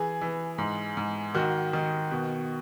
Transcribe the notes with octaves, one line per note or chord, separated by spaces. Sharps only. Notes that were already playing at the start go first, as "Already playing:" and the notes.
Already playing: E3 G#4
E3
G#2
G#2
D#3 F#4
D#3
B2